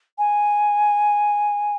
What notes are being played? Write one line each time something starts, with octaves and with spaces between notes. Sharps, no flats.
G#5